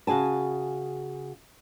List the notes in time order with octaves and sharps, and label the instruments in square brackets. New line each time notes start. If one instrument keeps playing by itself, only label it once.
[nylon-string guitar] C#3 F#4 G#4 G#5 A5